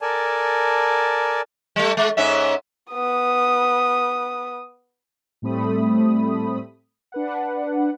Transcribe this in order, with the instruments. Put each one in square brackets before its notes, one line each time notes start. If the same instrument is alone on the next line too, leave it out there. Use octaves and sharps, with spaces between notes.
[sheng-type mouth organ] A4 A#4 D5 G#5 A5
[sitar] G3 A3
G#3
G#2 C#4 E5
[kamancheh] B3 D#6
[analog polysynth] A2 G3 A3 C4 B5 D#6
D4 B4 F#5